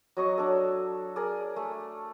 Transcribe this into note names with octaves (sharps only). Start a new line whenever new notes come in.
F#3 D#5 C#6
D4 A4
G#4 A#4 D5
A3